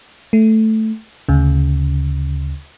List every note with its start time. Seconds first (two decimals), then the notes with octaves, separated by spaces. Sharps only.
0.33 A3
1.29 D2 C#3